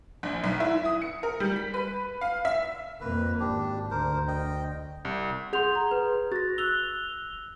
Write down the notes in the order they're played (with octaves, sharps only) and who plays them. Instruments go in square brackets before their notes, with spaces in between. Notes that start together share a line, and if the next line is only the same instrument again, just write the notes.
[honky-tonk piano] A#1
B1
E4
D#6
C#7
A#4
G3
B6
B4
F5
E5
[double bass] F2 A#3 [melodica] B4
[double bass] G#1 [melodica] D4 G4
[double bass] D2 [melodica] A#4 C5
[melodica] D#5 G5
[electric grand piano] C2
[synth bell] G#4 C6 [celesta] F#5 G6 F7
[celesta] A#5
B4
[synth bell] F#4 [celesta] A6 A#6
[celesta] E6 F#6 [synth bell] F7 G7